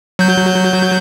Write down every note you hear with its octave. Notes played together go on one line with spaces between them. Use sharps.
F#3 G6